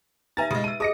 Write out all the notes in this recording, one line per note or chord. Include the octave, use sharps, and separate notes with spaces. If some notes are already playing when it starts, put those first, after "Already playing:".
D#4 B4 E5 G#5 A#5 A6
C#3 G#3
A5 E6 D#7
G#4 D#5 A5 D#6 A#6 C#7